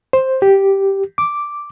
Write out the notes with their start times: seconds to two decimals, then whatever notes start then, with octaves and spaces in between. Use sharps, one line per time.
0.13 C5
0.42 G4
1.18 D6